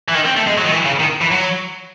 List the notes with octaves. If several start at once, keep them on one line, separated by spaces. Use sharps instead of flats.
E3
D#3
C4
A3
G#3
F#3
D#3
E3
C#3
D#3
E3
F#3